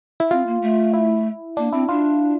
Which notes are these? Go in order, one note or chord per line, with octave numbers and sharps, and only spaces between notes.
E4
C4 F4
A#3
A3
E4
A#3 D4
C4 E4
D4 F4